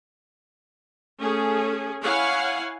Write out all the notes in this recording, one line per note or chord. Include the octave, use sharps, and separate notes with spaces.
A3 C#4 G#4
E4 C#5 F5 F#5 G#5